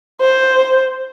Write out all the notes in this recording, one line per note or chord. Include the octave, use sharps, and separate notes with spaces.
C5